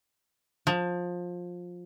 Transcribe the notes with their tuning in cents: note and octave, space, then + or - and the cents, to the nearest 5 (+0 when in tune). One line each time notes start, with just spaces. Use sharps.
F3 +20